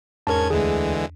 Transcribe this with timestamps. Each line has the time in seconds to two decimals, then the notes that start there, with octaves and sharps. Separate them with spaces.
0.27 E2 G#2 C#4 A#4 A5 G#6
0.50 D2 D3 E3 G#3 G#4